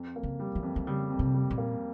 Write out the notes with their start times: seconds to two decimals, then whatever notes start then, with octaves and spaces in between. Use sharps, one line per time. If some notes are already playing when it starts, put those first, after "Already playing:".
Already playing: F2
0.16 A#3
0.23 C#3
0.40 G3
0.55 E3
0.63 F2
0.76 E3
0.87 C#3 G3
1.10 F2
1.19 C3
1.34 G3
1.50 A#2
1.58 A#3